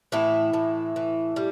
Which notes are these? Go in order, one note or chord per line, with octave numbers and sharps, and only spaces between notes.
A2 E3 E4
A2
E3
G3